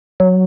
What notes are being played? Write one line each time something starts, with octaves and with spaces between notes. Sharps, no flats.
F#3